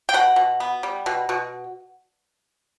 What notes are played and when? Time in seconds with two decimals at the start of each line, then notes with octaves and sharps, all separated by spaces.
0.09 G5
0.14 B2 F#5
0.36 B2
0.60 B3
0.83 G3
1.06 B2
1.29 B2